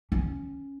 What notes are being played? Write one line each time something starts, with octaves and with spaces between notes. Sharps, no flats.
C#4